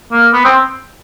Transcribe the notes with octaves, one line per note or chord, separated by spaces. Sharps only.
A#3
B3
C4